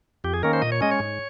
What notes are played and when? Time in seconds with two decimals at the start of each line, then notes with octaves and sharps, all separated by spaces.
0.24 F2 G4
0.34 G#4
0.43 D#3 A#3 C#4 A#4
0.53 C5
0.62 A#2 D#5
0.72 C#5
0.81 G#3 C#4 D#5
0.91 C#5
1.00 G#2